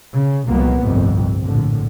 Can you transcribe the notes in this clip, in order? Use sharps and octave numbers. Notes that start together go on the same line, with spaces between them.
C#3
C2 F2 A#2 F#3 A#3 B3
G1 C2 F2 A2 C3
A#1 A2 D3